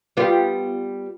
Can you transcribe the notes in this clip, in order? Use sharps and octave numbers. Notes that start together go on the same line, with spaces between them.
G3 B3 F4